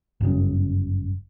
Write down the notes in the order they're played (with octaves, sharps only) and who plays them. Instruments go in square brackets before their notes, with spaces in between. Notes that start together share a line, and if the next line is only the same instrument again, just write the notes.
[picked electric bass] G1 F#2 C#3